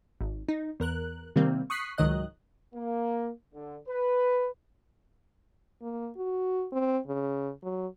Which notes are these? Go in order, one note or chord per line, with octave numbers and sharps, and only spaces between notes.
G#1
D#4
E2 A#4 F#6
C3 D#3 G3 A#3 C4
C#6 D#6 F#6 B6 C7
C#2 G#2 D#3 F#3 D#5 F#6
A#3
D3
B4
A#3
F#4
C4
C#3
F#3